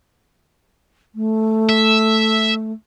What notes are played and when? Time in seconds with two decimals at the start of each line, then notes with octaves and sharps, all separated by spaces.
1.15 A3
1.69 E5